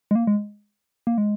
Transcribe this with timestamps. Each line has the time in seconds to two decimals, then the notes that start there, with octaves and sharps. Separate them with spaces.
0.11 G#3
0.15 A#3
0.27 G#3
1.07 A#3
1.18 G#3